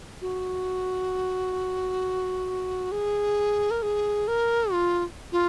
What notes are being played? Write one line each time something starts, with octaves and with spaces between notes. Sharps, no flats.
F#4
G#4
A#4
G#4
A#4
F4
F4